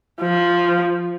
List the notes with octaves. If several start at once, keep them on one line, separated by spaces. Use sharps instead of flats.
F3